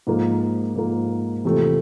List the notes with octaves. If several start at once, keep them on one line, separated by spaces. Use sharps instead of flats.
G#2 F3 A#3
G#2 F3 A#3
E2 C3 F3 A3 C4